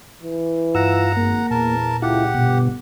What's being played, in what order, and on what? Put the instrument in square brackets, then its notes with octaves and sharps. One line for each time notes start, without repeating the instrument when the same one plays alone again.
[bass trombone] E3
[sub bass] G2 [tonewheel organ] F4 E6 [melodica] F#5 A#5
[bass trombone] G#1 [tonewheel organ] A#3
[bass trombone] E2 [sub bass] A#2 [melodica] A#4 A5
[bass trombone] C#2 [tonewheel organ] E4 F4 [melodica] G4 F#5
[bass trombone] G1 [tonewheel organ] B2